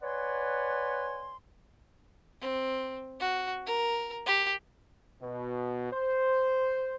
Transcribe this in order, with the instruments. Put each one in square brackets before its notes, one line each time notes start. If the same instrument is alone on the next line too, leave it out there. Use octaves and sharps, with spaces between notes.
[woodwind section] B4 C#5 D5 F#5 G#5 C6
[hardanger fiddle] C4
F#4
A#4
G4
[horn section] B2
C5